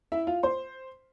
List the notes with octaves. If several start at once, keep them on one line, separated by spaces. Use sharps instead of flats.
E4 E5
F4 F5
C5 C6